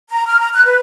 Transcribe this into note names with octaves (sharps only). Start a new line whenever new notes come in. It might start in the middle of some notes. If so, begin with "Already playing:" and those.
A#5
F6
A#5
F#6
B4